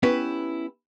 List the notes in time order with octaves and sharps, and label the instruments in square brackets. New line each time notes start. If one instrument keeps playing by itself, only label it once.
[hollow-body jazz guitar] B3 C#4 E4 G4 B4